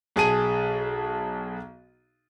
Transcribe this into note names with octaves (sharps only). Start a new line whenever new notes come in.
B1 G#4 A5 D#7